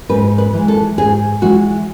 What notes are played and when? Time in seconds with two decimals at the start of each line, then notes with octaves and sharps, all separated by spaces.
0.09 G#2 B4
0.38 B4
0.53 E3 G#3
0.68 A4
0.98 G#2 G#4
1.42 E3 G#3 F#4